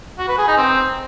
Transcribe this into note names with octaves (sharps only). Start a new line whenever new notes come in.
F#4
B4
G#4
D#4
C4